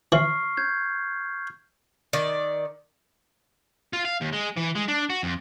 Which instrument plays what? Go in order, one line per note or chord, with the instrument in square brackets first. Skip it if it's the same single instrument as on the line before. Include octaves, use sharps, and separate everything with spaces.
[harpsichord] E3 [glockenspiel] C#6 F6 C7
[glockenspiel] G6 G#6
[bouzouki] D#3 D5
[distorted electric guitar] F4
F5
D#2
G#3
E3
G#3
D4
F#4
F2